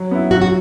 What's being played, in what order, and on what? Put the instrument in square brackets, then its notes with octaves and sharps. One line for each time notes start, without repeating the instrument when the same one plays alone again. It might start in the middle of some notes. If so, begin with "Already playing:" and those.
Already playing: [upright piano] F#3
B3 E4
[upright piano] F#3 [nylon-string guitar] F#4
[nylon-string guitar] F#4